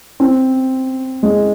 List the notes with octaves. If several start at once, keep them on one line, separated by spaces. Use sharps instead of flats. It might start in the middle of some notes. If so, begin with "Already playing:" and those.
C4
G#3